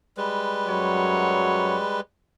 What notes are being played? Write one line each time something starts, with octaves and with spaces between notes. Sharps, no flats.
G3 G#3 B4
F#2 F#3 C#5